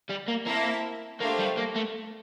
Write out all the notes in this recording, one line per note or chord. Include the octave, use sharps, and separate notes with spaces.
G3
A#3
A#3 C4 E4 A#4 E5 A5
A3 A#3 D4 G4 C5 F5
G3
A#3
A3